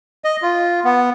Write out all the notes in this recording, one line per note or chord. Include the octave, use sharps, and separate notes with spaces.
D#5
F4
B3